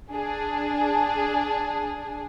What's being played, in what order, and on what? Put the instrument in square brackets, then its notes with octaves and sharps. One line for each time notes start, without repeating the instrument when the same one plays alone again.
[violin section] D4 G#4